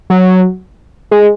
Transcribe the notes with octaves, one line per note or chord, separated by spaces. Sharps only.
F#3
G#3